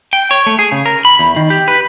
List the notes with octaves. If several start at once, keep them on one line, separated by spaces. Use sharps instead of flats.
G5
C#5
A3
G#4
C#3
A#4
B5
E2
D#3
G4
B4